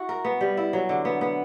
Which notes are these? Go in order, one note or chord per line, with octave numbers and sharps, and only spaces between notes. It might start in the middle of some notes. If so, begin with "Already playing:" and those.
Already playing: E4 F#4
A#4
B3
G3
E4
F#3
D3
B3
B3